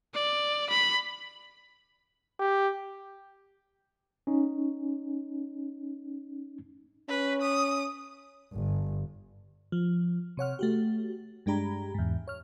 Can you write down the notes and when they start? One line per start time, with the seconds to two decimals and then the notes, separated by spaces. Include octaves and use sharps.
0.14 D5
0.70 B5
2.40 G4
4.27 C#4 D#4
7.09 C#4 B4
7.42 D#6
8.53 G1
9.72 F3
10.37 C3 C#5 F#5 F6
10.59 A3 F#4 G4
11.46 G2 G#3 D4 G4 A#5 B5
11.94 E2 G#2
12.28 C#5 F6